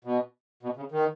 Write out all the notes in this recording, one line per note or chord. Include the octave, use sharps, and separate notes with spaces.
B2
B2
C#3
D#3